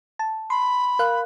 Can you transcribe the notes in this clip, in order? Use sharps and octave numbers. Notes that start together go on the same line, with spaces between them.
A5
B5 C6
A#4 F5 F#6